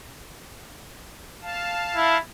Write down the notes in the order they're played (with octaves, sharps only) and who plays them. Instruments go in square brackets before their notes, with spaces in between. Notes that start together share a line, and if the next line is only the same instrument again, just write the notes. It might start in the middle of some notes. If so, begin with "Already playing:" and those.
[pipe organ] F5 A5
[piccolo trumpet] E4